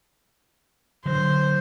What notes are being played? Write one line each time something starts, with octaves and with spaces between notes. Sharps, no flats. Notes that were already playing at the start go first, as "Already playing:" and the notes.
D3 F#3 C5